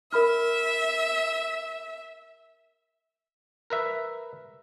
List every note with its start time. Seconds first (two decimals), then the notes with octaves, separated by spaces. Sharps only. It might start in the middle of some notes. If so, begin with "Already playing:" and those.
0.12 A#4 E5 B5 F6
3.70 A#4 B4 E5